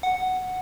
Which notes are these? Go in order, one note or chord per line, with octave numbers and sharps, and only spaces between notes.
F#5